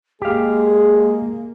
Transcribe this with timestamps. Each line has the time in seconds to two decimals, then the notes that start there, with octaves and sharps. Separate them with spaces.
0.22 G#3 A#3 G4 G#4 F5